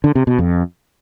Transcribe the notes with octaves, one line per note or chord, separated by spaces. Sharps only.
D3
C3
B2
F2